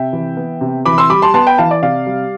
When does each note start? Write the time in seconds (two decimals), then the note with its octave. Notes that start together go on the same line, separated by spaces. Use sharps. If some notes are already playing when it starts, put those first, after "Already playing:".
Already playing: C3 E5 G5
0.13 E3
0.37 B3
0.61 C3
0.86 E3 B5 D6
0.98 C6 E6
1.10 G3 B5 D6
1.22 A5 C6
1.34 B3 A5 C6
1.47 G5 B5
1.58 E3 F5 A5
1.71 D5
1.82 C3 D5 F5
2.06 G3